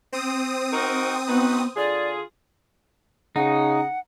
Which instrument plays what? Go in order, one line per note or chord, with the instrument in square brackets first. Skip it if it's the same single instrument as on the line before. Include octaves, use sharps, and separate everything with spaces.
[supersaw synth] C4 D#6
[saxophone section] D#4 F#4 A#4
[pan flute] B3 [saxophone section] D#4 F#4 B4
[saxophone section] D3 F4 G#4 [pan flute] D5
[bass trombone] C#3 [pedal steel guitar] D#4 [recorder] F#5